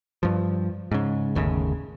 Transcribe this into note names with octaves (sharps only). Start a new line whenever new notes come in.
G2 F3
G#2 C#3
G1 D#2 A2 C#3